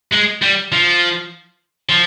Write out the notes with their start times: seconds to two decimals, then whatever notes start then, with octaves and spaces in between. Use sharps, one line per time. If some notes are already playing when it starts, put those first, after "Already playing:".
0.13 G#3
0.42 G3
0.72 F3
1.89 F3